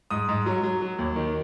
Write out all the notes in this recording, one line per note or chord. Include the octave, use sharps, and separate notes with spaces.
G#2 D#6
G#2
F#3
F#3
F#3
D#2
D#3